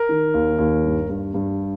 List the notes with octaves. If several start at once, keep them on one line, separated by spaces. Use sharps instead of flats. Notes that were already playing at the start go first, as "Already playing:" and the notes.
Already playing: A#4
D#3
D#2
D#2
G2
G2
G2